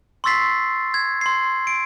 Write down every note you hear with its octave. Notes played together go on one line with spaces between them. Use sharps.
C6 C#6 E6 A6 B6 C7
G#6
C6 C7
D7